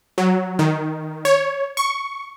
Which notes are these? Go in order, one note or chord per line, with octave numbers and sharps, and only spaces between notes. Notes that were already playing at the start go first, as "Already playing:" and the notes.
F#3
D#3
C#5
C#6